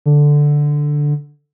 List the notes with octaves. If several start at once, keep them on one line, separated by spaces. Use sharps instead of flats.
D3